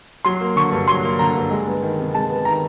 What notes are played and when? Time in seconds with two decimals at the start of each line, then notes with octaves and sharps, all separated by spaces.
0.25 F#3 C6
0.41 A#3
0.56 D3 C#6
0.72 G2
0.88 F#3 C6
1.04 A#3
1.19 D3 A#5
1.35 G2
1.51 G#3
1.67 B3
1.82 D#3
1.98 C3
2.14 G#3 A5
2.30 B3
2.45 D#3 A#5